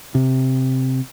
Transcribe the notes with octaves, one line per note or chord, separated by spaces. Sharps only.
C3